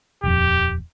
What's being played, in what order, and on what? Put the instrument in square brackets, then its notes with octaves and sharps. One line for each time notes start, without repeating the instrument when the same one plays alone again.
[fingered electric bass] D#1 F2 [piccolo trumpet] G4